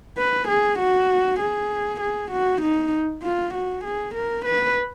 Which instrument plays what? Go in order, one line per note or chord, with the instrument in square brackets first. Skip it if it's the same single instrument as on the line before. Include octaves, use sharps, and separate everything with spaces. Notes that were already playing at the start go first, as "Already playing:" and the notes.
[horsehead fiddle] B4
G#4
F#4
G#4
G#4
F#4
D#4
F4
F#4
G#4
A#4
B4